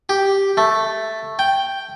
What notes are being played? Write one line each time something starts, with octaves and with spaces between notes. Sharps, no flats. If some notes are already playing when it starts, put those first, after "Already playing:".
G4
A3
G5